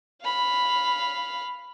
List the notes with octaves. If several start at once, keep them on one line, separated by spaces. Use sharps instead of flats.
F5 B5